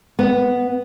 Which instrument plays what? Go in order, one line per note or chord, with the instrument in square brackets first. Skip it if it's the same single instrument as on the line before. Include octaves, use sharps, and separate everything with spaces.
[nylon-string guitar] B3